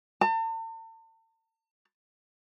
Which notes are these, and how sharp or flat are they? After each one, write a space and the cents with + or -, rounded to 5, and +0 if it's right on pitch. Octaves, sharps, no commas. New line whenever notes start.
A5 +45